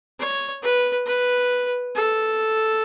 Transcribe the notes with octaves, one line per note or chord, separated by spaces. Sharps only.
C#5
B4
B4
A4